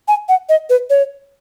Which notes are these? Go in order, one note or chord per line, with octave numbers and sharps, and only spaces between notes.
G#5
F#5
D#5
B4
C#5